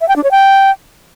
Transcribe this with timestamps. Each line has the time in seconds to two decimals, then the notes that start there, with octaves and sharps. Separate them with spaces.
0.01 E5
0.09 G5
0.16 D4
0.24 C#5
0.31 G5